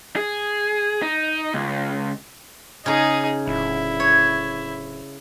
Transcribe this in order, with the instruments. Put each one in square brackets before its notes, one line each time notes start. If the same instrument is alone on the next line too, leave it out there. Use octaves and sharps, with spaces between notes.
[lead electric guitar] G#4
D#4
C#2
[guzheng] C#3 A#5 [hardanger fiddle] D#4 G#4
[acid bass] D1 [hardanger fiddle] E4
[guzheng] C#5